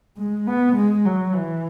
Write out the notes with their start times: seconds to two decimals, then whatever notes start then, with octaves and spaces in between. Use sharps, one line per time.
0.17 G#3
0.47 B3
0.76 G#3
1.05 F#3
1.34 E3